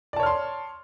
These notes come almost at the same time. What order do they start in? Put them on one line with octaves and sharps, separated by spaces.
D5 A5 C#5 F6 C6